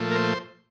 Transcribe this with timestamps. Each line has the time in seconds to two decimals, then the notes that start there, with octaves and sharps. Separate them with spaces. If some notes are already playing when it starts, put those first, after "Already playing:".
Already playing: A#2 F3 A3
0.11 A#4
0.15 C5